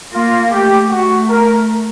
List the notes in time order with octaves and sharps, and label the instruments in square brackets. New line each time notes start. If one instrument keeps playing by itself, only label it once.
[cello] A#3 [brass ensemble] F4
[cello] A3 [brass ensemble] G4
[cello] A3 [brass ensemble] F#4
[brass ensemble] A#4